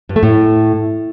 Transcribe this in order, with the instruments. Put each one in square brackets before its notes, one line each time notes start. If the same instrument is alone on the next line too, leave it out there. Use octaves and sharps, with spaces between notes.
[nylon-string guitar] G2
A3
A2